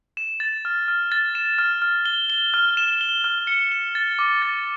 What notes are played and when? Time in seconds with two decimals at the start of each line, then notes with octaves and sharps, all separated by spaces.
0.17 E7
0.40 A6
0.65 F6
0.88 F6
1.12 A6
1.35 E7
1.58 F6
1.82 F6
2.06 G7
2.30 G7
2.54 F6
2.77 E7
3.01 G7
3.24 F6
3.47 C#7
3.72 E7
3.95 A6
4.19 D6
4.42 A6